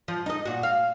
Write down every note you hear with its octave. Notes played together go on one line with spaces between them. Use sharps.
F3
D#4 D#5
A#2 F#4
F5